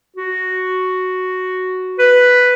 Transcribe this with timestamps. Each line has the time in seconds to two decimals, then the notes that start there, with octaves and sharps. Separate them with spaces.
0.16 F#4
1.99 B4